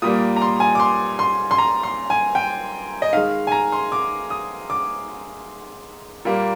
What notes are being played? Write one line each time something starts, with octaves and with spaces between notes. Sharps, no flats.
A#2 G3 A#3 D#6
A#5
C6
G#5
D6
C6
C6
C6
A#5
C6
G#5
G5
D#5
D#3 G#3 F5
G#5
A#5
C6
D6
D#6
D6
A#2 G3 A#3